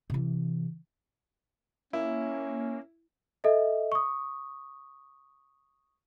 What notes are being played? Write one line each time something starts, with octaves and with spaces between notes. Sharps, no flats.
C3 E3
A#3 C#4 E4
A4 D#5 E5
C#6 D#6